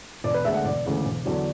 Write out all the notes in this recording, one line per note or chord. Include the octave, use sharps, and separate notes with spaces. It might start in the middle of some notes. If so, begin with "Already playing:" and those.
E1 D5
B4
D2 D3 G#3 E5
F#5
E1 D5
D2 C#3 E3 G#3
E1
E2 D3 F#3